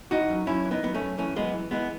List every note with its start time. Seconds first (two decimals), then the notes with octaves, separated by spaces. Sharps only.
0.11 E3 D#4 F#4
0.30 F#2
0.47 F#2 C#4 E4
0.65 E3
0.71 B3 D#4
0.83 F#2 B3
0.94 A3 C#4
1.00 F#2
1.18 E3 A3 C#4
1.36 F#2 G#3 B3
1.54 E3
1.71 E3 G#3 B3